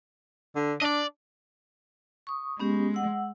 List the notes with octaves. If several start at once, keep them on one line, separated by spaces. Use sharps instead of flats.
D3
D4 D5 D#5
C#6 D#6
G#3 B3 C#4 G4
F#5 E6